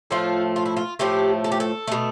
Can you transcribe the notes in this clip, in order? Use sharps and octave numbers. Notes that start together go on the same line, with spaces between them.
A2 F3 A3 F4
F4
E4
F4
A2 F3 A3 G4
A4
G4
A4
B2 A3